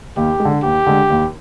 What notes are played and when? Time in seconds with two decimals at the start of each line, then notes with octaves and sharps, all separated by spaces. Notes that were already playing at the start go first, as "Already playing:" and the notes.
0.17 D#2 G4
0.40 G#3
0.45 D3
0.63 D#2 G4
0.87 D3 G#3
1.10 D#2